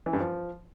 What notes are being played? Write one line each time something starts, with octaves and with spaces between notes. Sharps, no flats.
E3
G2
F3